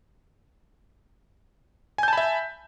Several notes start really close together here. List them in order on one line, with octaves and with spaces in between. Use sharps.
G#5 G6 A5 B5 E5